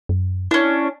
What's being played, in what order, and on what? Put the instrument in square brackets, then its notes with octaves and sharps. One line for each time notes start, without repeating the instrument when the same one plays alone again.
[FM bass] F#2
[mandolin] C#4 D4 [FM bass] E4